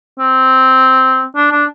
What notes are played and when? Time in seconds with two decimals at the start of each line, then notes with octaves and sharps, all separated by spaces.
0.19 C4
1.36 D4
1.52 D4